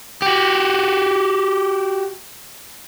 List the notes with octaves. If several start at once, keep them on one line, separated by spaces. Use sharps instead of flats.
F#4 G4